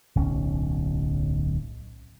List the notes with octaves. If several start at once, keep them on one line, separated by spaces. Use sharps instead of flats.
D1 B1 C#4